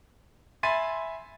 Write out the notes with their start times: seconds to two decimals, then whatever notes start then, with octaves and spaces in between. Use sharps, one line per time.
0.63 E5 G#5 B5 C6 A6 D#7